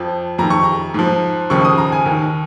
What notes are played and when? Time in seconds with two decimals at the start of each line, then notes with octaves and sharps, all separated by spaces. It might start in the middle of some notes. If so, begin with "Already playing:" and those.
Already playing: F2 F3
0.38 F2 D#3 A#5
0.50 C#6
0.64 A#5
0.94 G#2 F3
1.50 D#2 C#3 F3 C#6
1.65 D#6
1.78 A#5
1.92 G#5
2.06 D#2 D#3